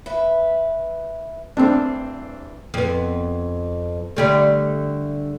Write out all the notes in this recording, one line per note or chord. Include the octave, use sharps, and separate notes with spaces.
B4 E5
E2 G2 A3 C4 D4
F2 B3
D3 G3 A3